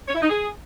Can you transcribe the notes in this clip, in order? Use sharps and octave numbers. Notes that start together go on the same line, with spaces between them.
C#5
E4
D#4
G#4